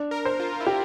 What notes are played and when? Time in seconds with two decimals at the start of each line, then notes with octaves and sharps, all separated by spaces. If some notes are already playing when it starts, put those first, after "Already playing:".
Already playing: D4
0.11 A#4
0.25 C5
0.40 F4
0.60 E4
0.67 F4 G4